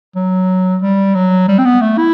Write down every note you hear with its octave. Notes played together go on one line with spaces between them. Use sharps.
F#3
G3
F#3
G3
C4
B3
A3
E4